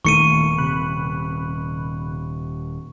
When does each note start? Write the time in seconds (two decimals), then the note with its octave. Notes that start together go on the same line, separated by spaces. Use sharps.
0.05 D#1 D#3 E3 A3 C#6 C#7 D#7
0.58 C3 B5 F#6